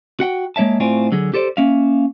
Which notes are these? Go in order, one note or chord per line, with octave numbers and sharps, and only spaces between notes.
F#4 F#5 G5
G#3 A#3 C#5 E5 A5
A2 A3 C4 F4 D5 G#5
D3 F#3 G#4
G4 A4 C5 D5
A#3 C#4 E5 F5